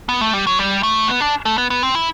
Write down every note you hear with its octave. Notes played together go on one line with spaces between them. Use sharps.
B3
A3
G3
F#3
G3
A3
B3
D4
A3
B3
B3
C4
E4